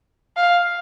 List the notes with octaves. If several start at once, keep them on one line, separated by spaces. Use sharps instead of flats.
F5